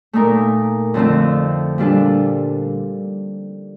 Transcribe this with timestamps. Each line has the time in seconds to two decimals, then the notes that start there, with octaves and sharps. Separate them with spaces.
0.13 A#2 A3 D#4 A#4
0.94 F2 D3 A3 C4 F4
1.78 A#2 G3 D4 F4 A4